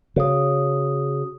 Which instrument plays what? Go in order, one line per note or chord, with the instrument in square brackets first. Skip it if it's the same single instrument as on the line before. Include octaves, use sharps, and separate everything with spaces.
[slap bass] C#3 [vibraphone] F#4 D#6